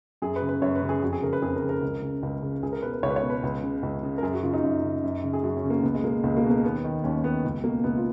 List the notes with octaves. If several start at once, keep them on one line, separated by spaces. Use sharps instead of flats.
F#2 G#4
B4
C#3
B4
F#2 C#5
B4
C#3
G#4
F2 F#4
G#4
C#3 A#4
B4
F2 G#4
A#4
C#3
A#4
C#2
C#3
C#2
C#3
C#2 G#4
A#4
B2 B4
B4
C#2 C#5
B4
C#5
B2
B4
C#2
C#3
C#2
C#3
A#4
F#2 G#4
F#4
C#3 F4
D#4
F#2
C#3
F#2
C#3
G#4
F#2 F#4
C#4
C#3
A#3
C#2 B3
G#3
B2 A#3
C#2 G#3
A#3
B2
A#3
D#2 B3
D#3
D#2 C#4
D#3 B3
C#2
B2 A#3
C#2 B3
F4